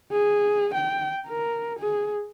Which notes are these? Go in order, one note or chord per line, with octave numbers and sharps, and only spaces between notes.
G#4
G5
A#4
G#4